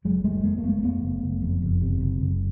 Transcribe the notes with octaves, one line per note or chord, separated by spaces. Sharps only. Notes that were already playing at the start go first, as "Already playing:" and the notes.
F#1 F#3 G#3
F#1 G3 A3
F2 G#3 A#3
A#3
F#1 A3 B3
F2 A3 B3
F#1
F#1
F2
F#1
C3
F#1
F#1